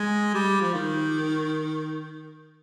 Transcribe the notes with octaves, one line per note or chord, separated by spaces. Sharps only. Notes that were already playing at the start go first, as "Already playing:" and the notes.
Already playing: G#3
G3
F3
D#3